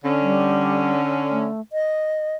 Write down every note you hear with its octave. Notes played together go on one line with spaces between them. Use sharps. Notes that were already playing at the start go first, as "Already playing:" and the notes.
D3 C#4
G3
A3
D#5